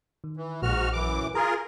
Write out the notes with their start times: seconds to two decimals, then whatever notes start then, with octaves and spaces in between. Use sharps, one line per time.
0.24 D#3
0.37 E3
0.62 A#1 G#2 F#4 F6
0.93 F#2 E3 D6
1.35 F4 G#4 A#4 A#5